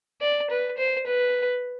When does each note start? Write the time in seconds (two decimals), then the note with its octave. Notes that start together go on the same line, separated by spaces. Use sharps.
0.21 D5
0.50 B4
0.78 C5
1.07 B4